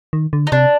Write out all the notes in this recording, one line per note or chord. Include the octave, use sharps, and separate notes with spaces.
D#3
D3
D#4
C3 D4